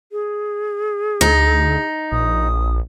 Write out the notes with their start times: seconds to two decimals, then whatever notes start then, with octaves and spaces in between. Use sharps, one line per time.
0.12 G#4
1.21 D2 D#4
2.12 A#1 D#6